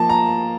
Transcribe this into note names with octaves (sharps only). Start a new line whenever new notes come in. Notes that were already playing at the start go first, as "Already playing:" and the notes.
Already playing: F3 A#3 A5
A#5